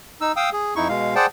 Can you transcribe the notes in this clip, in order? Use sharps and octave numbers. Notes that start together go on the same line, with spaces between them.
D#4 E6
F5 G5 D#6 E6
G#4
F2 D#4 E4 C#6
B2 G#3 F5
G#4 C5 D5 F#5 G5 A5